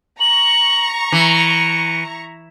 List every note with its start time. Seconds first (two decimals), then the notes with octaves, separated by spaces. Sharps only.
0.20 A#5 C#6 F#7
1.12 E3 C#7